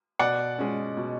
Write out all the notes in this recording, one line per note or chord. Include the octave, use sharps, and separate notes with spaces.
B2 D5 F#5
G#3 C#4
B2